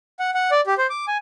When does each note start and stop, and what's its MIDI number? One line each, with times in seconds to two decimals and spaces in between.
0.20 0.31 78
0.34 0.50 78
0.51 0.61 74
0.67 0.74 67
0.78 0.87 72
0.90 1.05 86
1.08 1.17 80